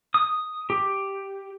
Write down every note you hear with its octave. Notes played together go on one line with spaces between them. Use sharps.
D#6
G4